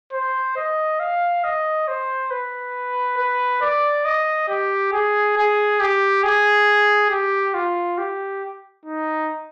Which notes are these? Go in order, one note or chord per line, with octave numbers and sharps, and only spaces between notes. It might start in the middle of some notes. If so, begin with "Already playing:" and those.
C5
D#5
F5
D#5
C5
B4
B4
D5
D#5
G4
G#4
G#4
G4
G#4
G4
F4
G4
D#4